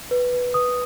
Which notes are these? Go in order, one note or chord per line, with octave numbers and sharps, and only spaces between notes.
B4
B4
B4 D#6